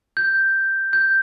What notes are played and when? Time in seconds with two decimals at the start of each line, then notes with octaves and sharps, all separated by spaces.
0.17 G6
0.93 G6